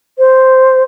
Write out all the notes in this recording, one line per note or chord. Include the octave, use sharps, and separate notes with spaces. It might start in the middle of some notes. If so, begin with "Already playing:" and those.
C5